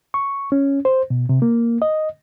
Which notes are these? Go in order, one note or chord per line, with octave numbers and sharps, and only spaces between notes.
C#6
C#4
C5
B2
C3
A#3
D#5